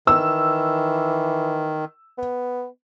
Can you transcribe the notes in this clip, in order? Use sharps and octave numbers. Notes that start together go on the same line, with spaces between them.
D#3 E3 E6
B3